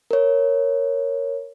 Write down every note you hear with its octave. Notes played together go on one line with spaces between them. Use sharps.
A#4 C#5